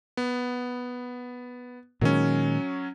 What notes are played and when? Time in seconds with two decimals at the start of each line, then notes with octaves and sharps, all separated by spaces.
0.17 B3
2.01 A#2 D#3 F#3 G#3 C#4